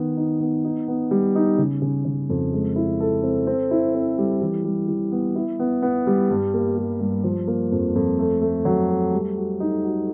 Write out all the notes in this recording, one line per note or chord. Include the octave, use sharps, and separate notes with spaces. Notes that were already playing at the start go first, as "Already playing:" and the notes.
Already playing: D#3 B3
D#4
B3
D#4
B3
G3
D#4
C#3
C#3
C#3
F2
G#3
E4
A4
C4
C4
E4
C4
G3
E3
G3
E3
B3
E4
B3
B3
G3
G2
A#3
G3
G2
F3
A#3
F2
F2
A3
A3
F#3
A3
G3
F#4
D#4
F#4